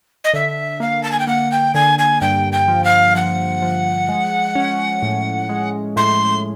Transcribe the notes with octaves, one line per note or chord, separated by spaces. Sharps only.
D#5
D3 E5
A#3 F5
A5
G#5
G5
A#3 F#5
G5
D3 G#5
G#5
G2 G5
G5
F3
F5
F3 F#5
F3
G#3
C#4
A2
G#3
A2 C6